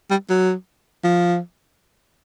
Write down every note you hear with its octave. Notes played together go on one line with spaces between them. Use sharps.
G3
F#3
F3